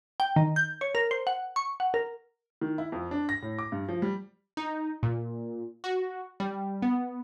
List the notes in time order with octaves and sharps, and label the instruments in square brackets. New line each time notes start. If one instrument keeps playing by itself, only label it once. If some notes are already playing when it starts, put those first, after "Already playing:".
[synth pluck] G5
D#3
G6
C#5
A#4
C5
F#5
C#6
F#5
A#4
[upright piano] D#3
E4
F2
D4
A#6
A2
D6
G2
F3
G3
[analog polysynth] D#4
A#2
F#4
G3
B3